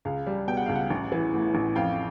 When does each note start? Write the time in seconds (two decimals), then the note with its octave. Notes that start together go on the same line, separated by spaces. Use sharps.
0.05 C#2 F5
0.27 G3
0.47 B2 G5
0.57 F#5
0.66 C#2 F5
0.76 F#5
0.91 A1
1.12 E3
1.34 A2
1.55 A1
1.76 F2 F5 G5